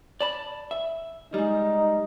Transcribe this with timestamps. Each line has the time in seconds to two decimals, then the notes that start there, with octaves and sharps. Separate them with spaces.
0.21 D5 A5 B5
0.71 E5
1.34 G3 G#3 D#4